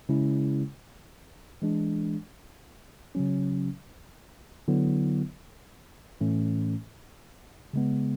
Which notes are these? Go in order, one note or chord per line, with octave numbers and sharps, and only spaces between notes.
C#3 G#3 C#4 E4
E3 G#3 D4
C#3 F#3 C#4
D3 F#3 B3 E4
A2 E3 A3 C#4
C#3 G#3 B3